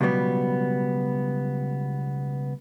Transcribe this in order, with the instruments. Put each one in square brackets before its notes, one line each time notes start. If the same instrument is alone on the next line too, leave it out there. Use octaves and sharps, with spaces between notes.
[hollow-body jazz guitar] C#2 B2 F#3 G3 B3